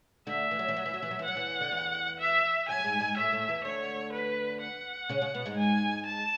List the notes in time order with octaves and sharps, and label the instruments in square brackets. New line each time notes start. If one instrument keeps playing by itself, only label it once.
[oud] D2 D3 [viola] E5
[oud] E3
F#3
E3
F#3
E3
F#3
E3
F#3
E3
[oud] F#3 [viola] F#5
[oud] E2 E3
D3
E2 E3
[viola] E5
[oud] F#2 F#3 [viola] G#5
[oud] G#2 G#3
G#2 G#3
[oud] A2 A3 [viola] E5
[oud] A2 A3
E2 E3
[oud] D2 D3 [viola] C#5
[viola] B4
F#5
[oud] C#3 C#4
C#3 C#4
B2 B3
G#2 G#3
[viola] G#5
A5